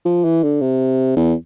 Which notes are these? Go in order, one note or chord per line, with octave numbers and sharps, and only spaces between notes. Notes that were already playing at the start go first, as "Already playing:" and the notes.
F3
E3
D3
C3
E2